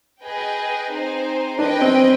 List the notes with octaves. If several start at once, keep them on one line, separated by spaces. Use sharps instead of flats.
G#4 B4 D#5 G5
C4 D#4 G#4 C5
D4 G#4 B4 D#5 G5
C4